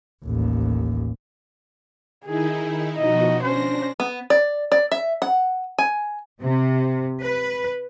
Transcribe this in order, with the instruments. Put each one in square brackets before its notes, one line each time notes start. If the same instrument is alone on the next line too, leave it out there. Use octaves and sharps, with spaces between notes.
[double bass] A1 D#2
[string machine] D#3 D#4 E4 [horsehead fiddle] G#4
[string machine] B2 F3 F#4 [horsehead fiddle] D#4 D#5
[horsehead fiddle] C#4 C5 [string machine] D4 A#6
[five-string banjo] B3
D5
D5
E5
F#5
G#5
[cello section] C3
B4